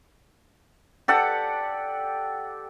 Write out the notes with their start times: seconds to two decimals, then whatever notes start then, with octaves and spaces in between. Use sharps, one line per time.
1.08 G4 A4 D5 F#5